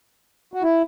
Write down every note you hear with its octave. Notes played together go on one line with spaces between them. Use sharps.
F#4
E4